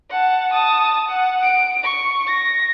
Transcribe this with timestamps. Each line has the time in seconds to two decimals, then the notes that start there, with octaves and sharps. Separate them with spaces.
0.10 F#5 A5
0.52 A5 D#6
1.08 F#5
1.43 D7
1.84 C#6
2.27 A#6